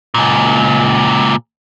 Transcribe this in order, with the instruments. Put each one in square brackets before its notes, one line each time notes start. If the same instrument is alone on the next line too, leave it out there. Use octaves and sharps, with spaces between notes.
[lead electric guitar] C#2 A#2